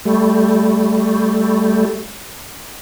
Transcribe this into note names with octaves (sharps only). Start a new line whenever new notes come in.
G3 A3